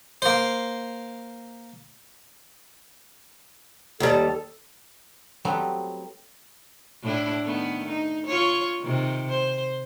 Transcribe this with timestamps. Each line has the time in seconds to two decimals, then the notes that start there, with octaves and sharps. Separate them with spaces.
0.22 A#3 C5
4.00 D#2 G3 A4
5.45 F#3 G3 A3 B3 C4
7.03 A2 D4 E4
7.45 D#3 A3 B3
7.88 D#4
8.27 F4 C#5
8.81 C3 D#3
9.30 C5